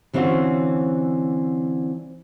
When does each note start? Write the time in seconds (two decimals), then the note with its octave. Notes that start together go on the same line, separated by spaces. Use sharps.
0.13 D3 E3 C4 C#4 F4 F#4